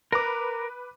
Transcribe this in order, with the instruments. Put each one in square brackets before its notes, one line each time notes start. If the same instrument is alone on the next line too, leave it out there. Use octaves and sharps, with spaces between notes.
[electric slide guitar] A#4 [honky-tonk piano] B4 D6